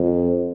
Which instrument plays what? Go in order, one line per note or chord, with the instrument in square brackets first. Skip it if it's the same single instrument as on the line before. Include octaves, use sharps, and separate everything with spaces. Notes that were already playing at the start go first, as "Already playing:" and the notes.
Already playing: [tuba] F2